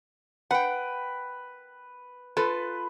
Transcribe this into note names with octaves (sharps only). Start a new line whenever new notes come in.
B4 F#5 G5
F4 A4 B4